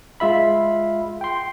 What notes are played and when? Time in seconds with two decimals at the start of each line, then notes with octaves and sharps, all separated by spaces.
0.20 G#3 F4 E5 B5
1.21 G5 C6